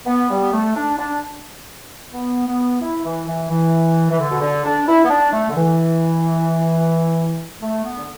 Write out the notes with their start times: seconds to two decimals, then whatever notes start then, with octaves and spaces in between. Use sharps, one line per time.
0.06 B3
0.30 G3
0.41 B3
0.52 A3
0.75 D4
0.98 D4
2.12 B3
2.47 B3
2.81 E4
3.04 E3
3.27 E3
3.49 E3
4.11 E3
4.19 D3
4.31 B2
4.40 D3
4.64 D4
4.87 E4
5.04 B3
5.09 D4
5.32 A3
5.49 D3
5.56 E3
7.61 A3
7.84 B3
7.97 D3